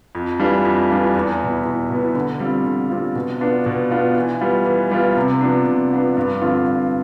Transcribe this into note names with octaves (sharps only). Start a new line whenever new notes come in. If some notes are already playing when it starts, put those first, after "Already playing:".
F2
E3 G3 D4 F4
F2
E3 G3 D4 F4
E2
B2 B3 E4
E2
B2 B3 E4
D3
G3 C4 F4
D3
G3 C4 F4
B2
B3 D4 F4
B2
B3 D4 F4
E3
G3 B3 F4
E3
G3 B3 F4
C3
F3 B3 D4
C3
F3 B3 D4
G2
D3 F3 C4 F4
G2